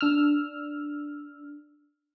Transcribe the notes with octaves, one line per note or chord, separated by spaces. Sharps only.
D4 E6 F6